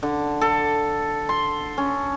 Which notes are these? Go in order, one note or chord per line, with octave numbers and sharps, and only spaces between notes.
D3
A4
C6
C#4